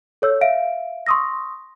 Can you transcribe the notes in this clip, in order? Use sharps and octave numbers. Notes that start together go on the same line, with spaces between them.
A4 C#5 E6 G6
E5 F5 D7
C6 C#6 D#6 E6 A#6